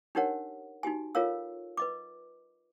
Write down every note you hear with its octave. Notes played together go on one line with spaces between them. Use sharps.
D4 D#4 G4 A#4 C#5 F#5
D#4 F#4 G4 G#5
F4 A4 A#4 C#5 F5 E6
B4 D#5 D6